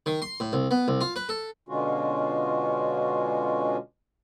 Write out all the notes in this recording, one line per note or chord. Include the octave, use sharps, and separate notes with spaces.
D#3
C6
A2
C2
B3
C2
F4
B4
A4
B2 D3 G#3 C#4 F4 F#4